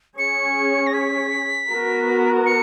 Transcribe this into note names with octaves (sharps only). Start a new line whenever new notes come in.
C#4 G#4 C#5 C#7
A#6
B6
B3 F#4 A#4
C#7